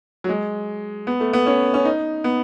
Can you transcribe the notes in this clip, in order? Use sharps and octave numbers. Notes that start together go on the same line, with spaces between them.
F#3
G#3
B3
A3
B3
C#4
C#4
D#4
B3